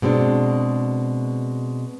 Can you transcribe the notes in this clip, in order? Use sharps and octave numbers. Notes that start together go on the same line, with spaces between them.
B2 G#3 C4 D4